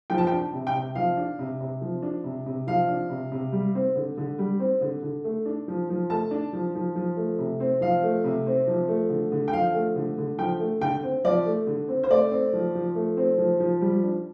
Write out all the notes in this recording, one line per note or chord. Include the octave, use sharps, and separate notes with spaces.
F3 G5
A5
G5
D4
C3
G5
C3
F3 F5
D4
C3
C3
F3
D4
C3
C3
F3 F5
D4
C3
C3
G3
C4
D3
D3
G3
C4
D3
D3
A3
D4
F3
F3
A3 A5
D4
F3
F3
F3
A3
C3
C4
F3 F5
A3
C3
C4
F3
A3
D3
D3
G5
F3 F5
A3
D3
D3
F3 G5
A3
D3 G5
C4
F3 D5
A3
D3
C4
C5
A3 D5
C4
F3
F3
A3
C4
F3
F3
G3
D4